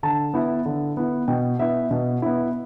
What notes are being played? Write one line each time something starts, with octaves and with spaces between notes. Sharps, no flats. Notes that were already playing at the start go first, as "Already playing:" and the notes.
D3 A5
B3 E4
D3
B3 E4
B2 G5
B3 E4 E5
B2
B3 E4